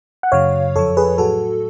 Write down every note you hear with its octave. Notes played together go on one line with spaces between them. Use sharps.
F#5
F#2 C#3 F#3 C#5 F5
F2 F3 A4 C#5
G#4 B4
A2 F#3 F#4 A4